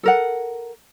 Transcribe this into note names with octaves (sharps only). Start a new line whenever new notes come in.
A4 A#4 F#5